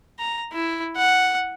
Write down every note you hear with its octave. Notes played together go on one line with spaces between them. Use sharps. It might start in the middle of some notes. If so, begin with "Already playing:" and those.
A#5
E4
F#5